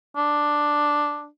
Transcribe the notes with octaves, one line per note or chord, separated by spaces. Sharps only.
D4